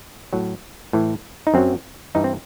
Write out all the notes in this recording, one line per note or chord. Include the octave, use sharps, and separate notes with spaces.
A2 F#3
A2 E3
D#4
F#2 F#3 C4
G2 E3 D#4
C4